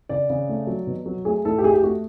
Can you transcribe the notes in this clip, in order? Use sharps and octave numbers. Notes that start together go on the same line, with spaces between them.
C#3 D5
C#3
A3
F#3
B2
F#3
A3 G#4
A2 A4
G4
A3 G#4
G4
A3 F#4